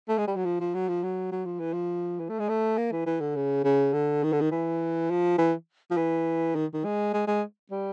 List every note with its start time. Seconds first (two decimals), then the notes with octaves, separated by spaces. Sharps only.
0.08 A3
0.18 G#3
0.27 G3
0.36 F#3
0.45 F3
0.60 F3
0.74 F#3
0.88 F3
1.03 F#3
1.32 F#3
1.46 F3
1.60 E3
1.73 F3
2.20 E3
2.29 A3
2.39 G#3
2.49 A3
2.77 A#3
2.92 E3
3.06 E3
3.20 D3
3.36 C#3
3.64 C#3
3.93 D3
4.23 D#3
4.33 D3
4.41 D#3
4.51 E3
5.10 F3
5.38 E3
5.91 F3
5.97 E3
6.55 D#3
6.74 D#3
6.85 G#3
7.14 G#3
7.27 G#3
7.71 G3